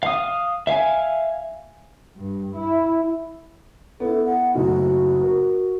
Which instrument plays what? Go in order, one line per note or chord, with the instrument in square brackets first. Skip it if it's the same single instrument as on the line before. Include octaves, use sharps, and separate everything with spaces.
[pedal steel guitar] F5 D#6
E5 F5 G#5
[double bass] G2
E4
[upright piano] B3 E4 [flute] A4
[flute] F#5
[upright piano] F#1 A2 D#4 [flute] F#4
[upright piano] A#4